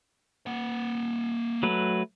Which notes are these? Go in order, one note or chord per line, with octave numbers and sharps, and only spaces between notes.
A#3 F#5
F#3 A3 B4